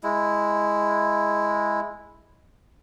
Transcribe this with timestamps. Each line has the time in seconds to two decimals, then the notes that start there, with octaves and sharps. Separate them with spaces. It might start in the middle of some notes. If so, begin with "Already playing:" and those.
0.03 G#3 E4